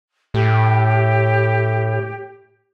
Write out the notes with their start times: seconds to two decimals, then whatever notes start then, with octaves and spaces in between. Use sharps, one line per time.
0.34 A2 G4